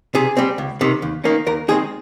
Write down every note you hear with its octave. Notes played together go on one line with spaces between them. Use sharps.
C3 G#4
G3 C4
C#2
C3 D#3
D#2
D#3 A#3 C#4
D#2 A#4
D#3 G#3 C4 G#4